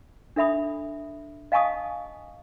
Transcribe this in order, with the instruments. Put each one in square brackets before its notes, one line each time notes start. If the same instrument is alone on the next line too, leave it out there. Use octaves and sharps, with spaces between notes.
[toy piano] D4 A4 E5 B5 D#6
D#5 F5 G#5 A5 C#6 D#6